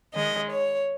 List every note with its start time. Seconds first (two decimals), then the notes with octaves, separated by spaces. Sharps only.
0.13 D#3 G#3 D#5
0.51 C#5